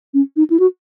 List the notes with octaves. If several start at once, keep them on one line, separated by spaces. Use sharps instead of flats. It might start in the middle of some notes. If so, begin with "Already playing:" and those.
C#4
D#4
E4
F#4